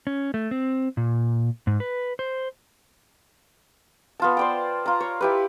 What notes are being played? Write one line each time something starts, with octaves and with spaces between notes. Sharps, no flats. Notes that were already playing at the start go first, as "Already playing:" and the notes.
C#4
A3
C4
A#2
G#2
B4
C5
B3 F4 A5
C5 D5 G5
F4 A#5
C#5
E4 G4 B4